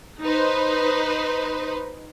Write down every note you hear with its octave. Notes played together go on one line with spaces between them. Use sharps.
D#4 B4 C5